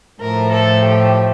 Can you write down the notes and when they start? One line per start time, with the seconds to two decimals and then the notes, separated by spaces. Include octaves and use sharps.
0.21 A2 F3 A3 A#4
0.52 A4
0.84 G4